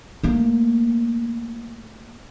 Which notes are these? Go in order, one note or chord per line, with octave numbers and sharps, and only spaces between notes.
A3 A#3